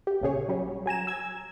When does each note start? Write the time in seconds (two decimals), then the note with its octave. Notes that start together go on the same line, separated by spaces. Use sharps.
0.07 G4
0.21 A#1 A#2 C#3 G#4 C#5
0.48 F#3 G3 C#4
0.86 F#3 G#5 A#5 E7
1.07 E6 G#6